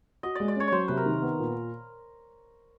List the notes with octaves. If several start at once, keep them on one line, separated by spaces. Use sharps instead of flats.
F#4 D#5
G#3 D5
D5
C#4 C#5
F#3 C5 C#5
C3 B4
A#4
D#3
B3
A#2